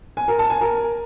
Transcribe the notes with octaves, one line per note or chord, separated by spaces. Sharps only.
G#5
A#4
A5
G#5
A#4